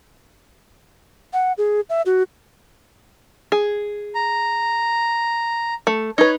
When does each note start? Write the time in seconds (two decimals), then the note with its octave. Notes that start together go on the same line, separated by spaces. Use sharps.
1.33 F#5
1.58 G#4
1.90 E5
2.06 F#4
3.52 G#4
4.15 A#5
5.87 A3
6.18 D#4 B4 C#5